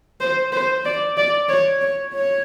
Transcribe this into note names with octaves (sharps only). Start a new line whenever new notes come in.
C5
C5
D5
D5
C#5
C#5
C#5